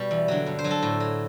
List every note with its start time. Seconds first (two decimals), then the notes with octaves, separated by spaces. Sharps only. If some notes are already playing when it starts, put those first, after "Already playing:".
Already playing: B2 G3
0.11 E2
0.28 D3 F#3
0.46 G2
0.59 C5
0.64 F#3
0.71 A4
0.83 A2
1.00 F#3